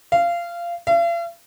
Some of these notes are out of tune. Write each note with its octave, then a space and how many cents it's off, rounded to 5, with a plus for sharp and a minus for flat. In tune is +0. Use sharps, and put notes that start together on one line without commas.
F5 -20
F5 -45